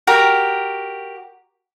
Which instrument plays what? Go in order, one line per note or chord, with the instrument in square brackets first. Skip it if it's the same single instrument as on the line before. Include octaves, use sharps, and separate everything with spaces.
[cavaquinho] F#4 G4 A#4